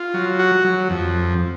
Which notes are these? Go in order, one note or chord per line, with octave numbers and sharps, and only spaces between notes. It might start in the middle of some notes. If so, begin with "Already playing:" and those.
Already playing: F4
F#3
F#4
F#3
F2